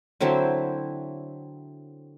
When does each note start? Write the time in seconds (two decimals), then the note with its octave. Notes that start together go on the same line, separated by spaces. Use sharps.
0.20 D3 F#3 C4 E4